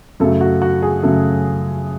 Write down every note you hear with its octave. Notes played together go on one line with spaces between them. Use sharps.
F#2 C#3 F#3 A3 A4
F#4
F#4
G#4
F#2 C#3 F#3 A3 A4